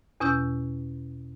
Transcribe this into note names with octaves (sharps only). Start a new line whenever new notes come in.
E2 B2 C#4 E6 G6